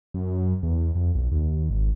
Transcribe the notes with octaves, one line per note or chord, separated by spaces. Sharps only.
F#2
E2
F2
B1
D#2
G#1